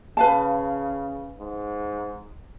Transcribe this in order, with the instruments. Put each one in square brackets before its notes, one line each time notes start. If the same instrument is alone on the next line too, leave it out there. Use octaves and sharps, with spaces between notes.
[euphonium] C#3 [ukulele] B4 F5 A5
[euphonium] G#2